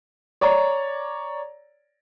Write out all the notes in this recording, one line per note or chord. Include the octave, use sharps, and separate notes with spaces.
C#5 D5 A#5